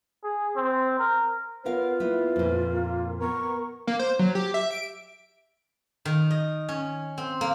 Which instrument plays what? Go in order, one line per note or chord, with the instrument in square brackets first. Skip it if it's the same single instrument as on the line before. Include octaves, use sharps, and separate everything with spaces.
[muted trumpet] G#4
C4
A#4
[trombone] B3 [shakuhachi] F4 [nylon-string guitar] A#4 C#5 F5 [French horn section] B4
[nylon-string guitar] A#3 B3 [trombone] E4
[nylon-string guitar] F2 A#2
[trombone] A#3
[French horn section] B3 [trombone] A#4 [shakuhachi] C#6
[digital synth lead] A#3
C5
F#3
G4
E5
D7
[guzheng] D#3
D#5
C#4
C4
A#3